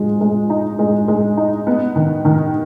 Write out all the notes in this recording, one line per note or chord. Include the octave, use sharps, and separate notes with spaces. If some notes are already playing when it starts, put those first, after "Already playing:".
Already playing: F3 G#3
G#3
D#4
G#3
G#3
D#4
B3
D#3
D#3